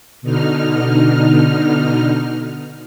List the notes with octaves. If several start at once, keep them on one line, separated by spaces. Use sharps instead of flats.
B2 D3 D#4 F6